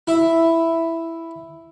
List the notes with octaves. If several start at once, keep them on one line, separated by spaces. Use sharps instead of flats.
E4 E5